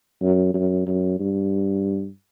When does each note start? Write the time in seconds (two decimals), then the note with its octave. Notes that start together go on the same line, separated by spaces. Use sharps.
0.22 F#2
0.54 F#2
0.86 F#2
1.19 G2